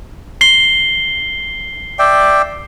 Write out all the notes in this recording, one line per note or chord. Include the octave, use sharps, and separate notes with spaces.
C7 G7
D5 E5 G5